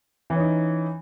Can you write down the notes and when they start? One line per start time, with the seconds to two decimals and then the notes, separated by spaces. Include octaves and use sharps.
0.30 E3
0.35 C#4
0.40 D#4